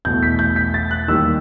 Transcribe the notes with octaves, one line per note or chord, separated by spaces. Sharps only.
E2 B2 A3 G6
B6
G6
B6
A6
F#6
D#2 D#3 G3 E6